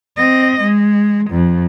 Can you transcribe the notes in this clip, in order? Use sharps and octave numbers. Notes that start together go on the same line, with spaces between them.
C4 D#5
G#3
F2